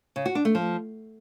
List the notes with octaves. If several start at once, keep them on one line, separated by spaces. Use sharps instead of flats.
C#3
F#4
D4
A3
F3